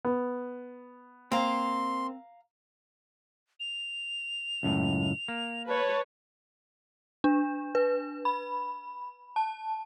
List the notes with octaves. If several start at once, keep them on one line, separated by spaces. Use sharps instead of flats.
B3
A#3 C4 F5 A#5 C6
F7
C#2 F#2 A2
A#3
B4 C#5 A5
D4
B4
B5
A5